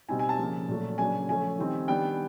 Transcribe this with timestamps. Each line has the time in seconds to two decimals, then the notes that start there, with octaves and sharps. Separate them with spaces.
0.09 B2 G3 C4 D#4 G#5
0.19 G#5
0.29 A5
0.38 C#3 F3 A#3
0.68 A#2 F#3 A3
0.98 C#3 F#3 A#3 D4 G#5
1.29 F3 A3 C#4 G#5
1.59 D#3 G3 C4 D#4
1.88 D#3 G3 B3 D4 G5